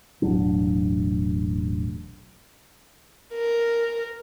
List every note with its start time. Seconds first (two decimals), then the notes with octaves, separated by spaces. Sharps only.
0.22 E1 A1 F#3 D4
3.34 A#4